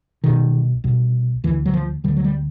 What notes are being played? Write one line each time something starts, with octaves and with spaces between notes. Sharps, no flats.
C2 B2 D#3
C2 B2
D2 D3 E3
F#3
F3
D2 D3 G3
F#3
G3